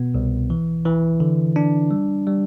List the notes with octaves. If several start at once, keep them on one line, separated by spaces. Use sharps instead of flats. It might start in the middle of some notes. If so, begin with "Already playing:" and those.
Already playing: B2 B3
C2
E3
E3
D3
D4
G3
G3